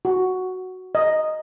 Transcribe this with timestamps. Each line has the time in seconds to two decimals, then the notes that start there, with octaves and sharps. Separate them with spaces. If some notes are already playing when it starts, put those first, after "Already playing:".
0.05 F#4
0.95 D#5